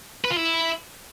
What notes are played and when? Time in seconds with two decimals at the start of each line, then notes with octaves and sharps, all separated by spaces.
0.25 B4
0.30 F4
0.36 E4